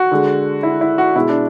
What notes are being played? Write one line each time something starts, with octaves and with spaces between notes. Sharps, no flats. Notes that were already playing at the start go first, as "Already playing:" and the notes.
Already playing: F#4
D3 G#3
E4
E4
F#4
B2 G#3 E4
D4